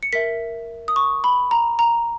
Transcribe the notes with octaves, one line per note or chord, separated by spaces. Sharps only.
C#7
A#4 E5 B6
D#6
C#6
B5
A#5
A#5